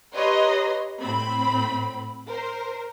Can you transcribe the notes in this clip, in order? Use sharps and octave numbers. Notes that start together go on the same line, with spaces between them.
G4 B4 C#5 D#5 A#5 C6
A2 C4 B5
A#4 C5